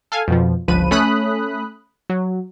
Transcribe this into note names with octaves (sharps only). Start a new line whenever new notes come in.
A4 F5 G#5
F2 B2 F3
G1 C#2 F3 B4 D#7
A3 C#4 B5 D#6 F#6
F#3